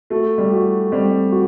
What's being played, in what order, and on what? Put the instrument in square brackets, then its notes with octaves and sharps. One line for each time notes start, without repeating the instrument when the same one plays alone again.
[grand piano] A3 [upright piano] F#4
[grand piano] G3
[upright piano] F#4
[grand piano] G3 [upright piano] C4
[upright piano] F#4